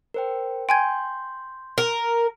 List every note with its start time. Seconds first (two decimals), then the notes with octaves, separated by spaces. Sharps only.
0.14 A#4 C5 G5
0.69 G5 G#5 C6 G6 G#6
1.78 A#4